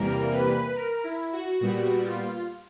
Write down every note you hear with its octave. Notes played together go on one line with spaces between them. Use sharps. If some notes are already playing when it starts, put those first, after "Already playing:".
Already playing: E2 C3 E3 G3 A#3 A#4
B4
A#4
E4
F#4
A#2 G3 B3 F#4
F4